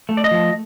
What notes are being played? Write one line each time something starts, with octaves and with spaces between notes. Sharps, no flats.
A3
D5
D#5
F3